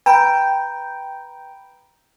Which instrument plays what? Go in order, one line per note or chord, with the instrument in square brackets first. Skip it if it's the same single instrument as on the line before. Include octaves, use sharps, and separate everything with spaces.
[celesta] B4 A#5 B5 [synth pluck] G5